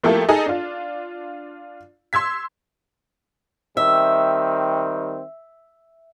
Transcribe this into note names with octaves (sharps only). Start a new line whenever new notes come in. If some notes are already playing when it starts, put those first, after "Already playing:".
F3 A3 A#3 E4 G4 A4
D#4 G#4 A4
D4 F4
C6 E6 G#6 B6
D#3 G3 C4 E5